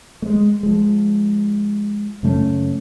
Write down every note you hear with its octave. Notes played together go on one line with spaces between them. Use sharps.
G#3 A3
F3 G#3
F#2 C#3 A3 C#4